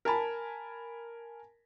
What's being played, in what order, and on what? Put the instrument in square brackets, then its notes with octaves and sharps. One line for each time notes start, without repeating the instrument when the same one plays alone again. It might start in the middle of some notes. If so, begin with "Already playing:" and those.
[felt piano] A#4 G#5 A5 B5